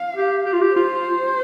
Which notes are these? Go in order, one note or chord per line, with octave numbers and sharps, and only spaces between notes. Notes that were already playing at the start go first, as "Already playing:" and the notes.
Already playing: F5
G4
G4
F4
G4
F4 C5